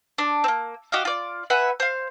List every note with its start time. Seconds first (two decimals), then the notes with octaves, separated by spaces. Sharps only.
0.18 D4
0.44 A#3 C4
0.92 F#4 G4 D#5 F5
1.05 F4 D5
1.50 B4 E5 F#5 G#5
1.80 C5 F5